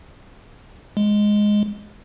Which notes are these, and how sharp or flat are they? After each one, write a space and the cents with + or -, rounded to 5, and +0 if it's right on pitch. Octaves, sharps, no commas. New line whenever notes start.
G#3 +0